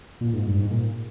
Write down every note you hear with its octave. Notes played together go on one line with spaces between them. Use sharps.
A#2
G#2
G2
G#2
A#2